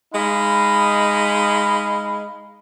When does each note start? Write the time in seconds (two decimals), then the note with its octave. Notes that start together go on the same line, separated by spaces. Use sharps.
0.14 G#3 D#4 F5 B5